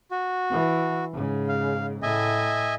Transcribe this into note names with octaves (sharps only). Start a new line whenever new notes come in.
F#4
E3
G#2 C#3
F5
A2 D#5 E5 G#5